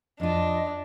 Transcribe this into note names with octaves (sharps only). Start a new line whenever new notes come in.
F2 D4 F4 D#5